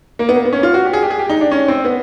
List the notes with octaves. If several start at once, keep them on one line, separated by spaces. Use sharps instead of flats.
A#3
B3
A#3
B3
C#4
F4
F#4
G4
G#4
G4
G#4
G4
D#4
D4
C#4
C4
B3